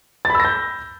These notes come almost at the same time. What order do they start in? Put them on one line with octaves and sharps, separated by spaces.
A6 B5 E6 A#6 G6